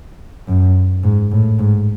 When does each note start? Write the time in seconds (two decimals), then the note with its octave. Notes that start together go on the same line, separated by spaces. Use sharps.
0.48 F#2
1.04 G#2
1.32 A2
1.59 G#2